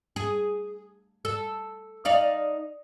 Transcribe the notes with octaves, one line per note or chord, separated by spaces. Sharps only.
G#4
A4
D#4 D5 F5